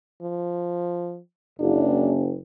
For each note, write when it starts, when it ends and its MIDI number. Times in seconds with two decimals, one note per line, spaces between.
0.22 1.20 53
1.60 2.35 30
1.60 2.11 62